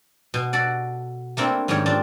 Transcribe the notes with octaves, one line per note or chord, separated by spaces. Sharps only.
B2
F#4 A4 D5
A3 A#3 C4 D4 E4
G#2 D#3 G3 C#4 G4 C#5
C4 D4 F4 D5